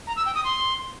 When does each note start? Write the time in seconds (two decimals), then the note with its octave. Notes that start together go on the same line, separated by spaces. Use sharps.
0.07 A#5
0.16 E6
0.26 G5
0.35 D#6
0.44 C6